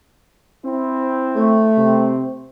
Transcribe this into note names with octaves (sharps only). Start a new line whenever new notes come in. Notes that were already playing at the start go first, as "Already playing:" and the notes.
C4 E4
A3
C3 C4